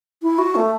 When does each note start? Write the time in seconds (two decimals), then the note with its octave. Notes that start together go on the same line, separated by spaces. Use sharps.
0.22 E4
0.38 F#4
0.55 A3